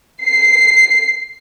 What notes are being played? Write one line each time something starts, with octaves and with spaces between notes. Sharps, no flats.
C7